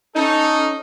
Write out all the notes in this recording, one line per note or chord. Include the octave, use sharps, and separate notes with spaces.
C#4 D#4 A4